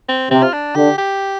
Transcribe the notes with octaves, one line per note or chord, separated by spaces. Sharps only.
C4
C3 C4
F4
D4
D3 G4
G4